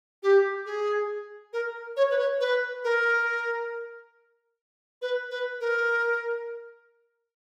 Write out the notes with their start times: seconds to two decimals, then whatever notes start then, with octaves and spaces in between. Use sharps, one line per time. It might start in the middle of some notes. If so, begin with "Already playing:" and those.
0.23 G4
0.66 G#4
1.53 A#4
1.97 C#5
2.11 B4
2.19 C#5
2.40 B4
2.84 A#4
5.02 B4
5.31 B4
5.61 A#4